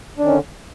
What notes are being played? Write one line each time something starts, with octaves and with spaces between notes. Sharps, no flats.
D3 D#3 C#4 D4